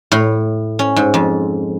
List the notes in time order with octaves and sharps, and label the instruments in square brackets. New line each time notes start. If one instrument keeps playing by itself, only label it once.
[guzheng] A2
C#4
G#2
F2